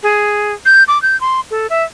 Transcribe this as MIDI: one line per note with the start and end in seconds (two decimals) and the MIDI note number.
0.03 0.53 68
0.66 0.84 91
0.88 1.01 86
1.02 1.19 91
1.21 1.41 84
1.51 1.67 69
1.70 1.84 76